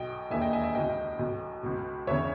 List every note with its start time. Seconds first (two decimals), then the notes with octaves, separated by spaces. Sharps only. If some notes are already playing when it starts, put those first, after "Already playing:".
Already playing: B1 B2 D#5 G5
0.30 E1 D#2 D#3 E5 G#5
0.41 D#5 G5
0.53 E5 G#5
0.63 E5 G#5
0.75 C#2 B2 D#5 G5
1.19 B1 B2
1.63 C#2 B2
2.07 E1 E2 C#3 C#5 E5